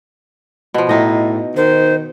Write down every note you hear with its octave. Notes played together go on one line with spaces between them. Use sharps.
B2 F3
A2 D#4 D#5
D#3 C5